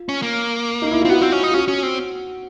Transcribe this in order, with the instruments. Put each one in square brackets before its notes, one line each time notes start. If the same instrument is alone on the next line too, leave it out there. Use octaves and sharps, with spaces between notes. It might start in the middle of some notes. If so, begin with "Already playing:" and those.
Already playing: [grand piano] F4
[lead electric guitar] C#4
A#3
[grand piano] D#4
E4
[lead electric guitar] C4 [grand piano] F4
[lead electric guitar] B3 [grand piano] F#4
[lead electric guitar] C4
C#4
D#4
[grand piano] F4
[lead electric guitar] C#4 [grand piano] F#4
[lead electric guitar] C#4
C4